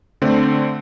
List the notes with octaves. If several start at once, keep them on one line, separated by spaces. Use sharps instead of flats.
D3 A3 C4